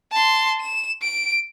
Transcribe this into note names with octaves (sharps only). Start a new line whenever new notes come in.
A5 C6
E7
D7